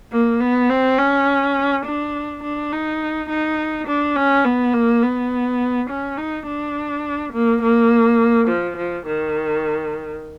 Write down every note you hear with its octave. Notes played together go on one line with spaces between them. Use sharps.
A#3
B3
C4
C#4
D4
D4
D#4
D#4
D4
C#4
B3
A#3
B3
C#4
D#4
D4
A#3
A#3
F3
F3
D#3